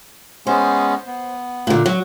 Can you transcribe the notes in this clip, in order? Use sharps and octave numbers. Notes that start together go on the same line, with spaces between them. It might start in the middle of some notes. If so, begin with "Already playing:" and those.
G#3 B3 C#4 C5
B3
A#2 D3
F#3